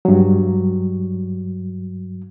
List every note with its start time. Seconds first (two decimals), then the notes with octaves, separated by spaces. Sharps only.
0.05 G2 F#3